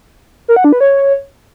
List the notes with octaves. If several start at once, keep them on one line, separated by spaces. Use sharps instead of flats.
A#4
F#5
D4
B4
C#5